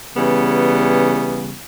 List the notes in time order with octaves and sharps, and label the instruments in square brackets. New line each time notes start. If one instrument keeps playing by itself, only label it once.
[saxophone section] C#3 E3 G3 B3